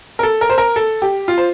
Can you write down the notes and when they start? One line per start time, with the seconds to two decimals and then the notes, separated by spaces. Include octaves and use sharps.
0.19 A#4
0.23 A4
0.41 A#4
0.50 C5
0.58 A#4
0.76 A4
1.02 G4
1.28 F4
1.38 C5